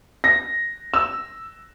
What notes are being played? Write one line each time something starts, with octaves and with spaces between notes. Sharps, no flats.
A#6
E6